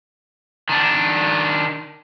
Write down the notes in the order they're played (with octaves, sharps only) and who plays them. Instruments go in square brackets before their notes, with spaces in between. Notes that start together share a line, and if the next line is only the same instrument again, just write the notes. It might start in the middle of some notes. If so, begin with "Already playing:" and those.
[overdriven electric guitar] D#3 D4